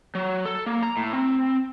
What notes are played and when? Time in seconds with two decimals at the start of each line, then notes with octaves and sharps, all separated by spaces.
0.15 F#3
0.45 A4
0.66 A#3
0.83 A#5
0.97 A2
1.13 C4